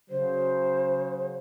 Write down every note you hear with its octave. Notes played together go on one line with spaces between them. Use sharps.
C#3 F#3 C5